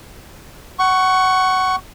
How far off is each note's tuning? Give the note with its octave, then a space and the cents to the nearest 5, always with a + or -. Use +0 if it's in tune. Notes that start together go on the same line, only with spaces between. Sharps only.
F#5 +20 C#6 +0